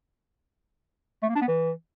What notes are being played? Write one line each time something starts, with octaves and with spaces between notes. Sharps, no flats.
A3
A#3
D4
B3
E3